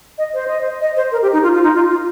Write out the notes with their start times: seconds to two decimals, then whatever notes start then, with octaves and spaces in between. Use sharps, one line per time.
0.18 D#5
0.34 C5
0.48 D#5
0.61 C5
0.81 D#5
0.96 C5
1.12 A#4
1.22 G4
1.33 D#4
1.43 F4
1.54 F4
1.63 D#4
1.74 F4
1.89 F4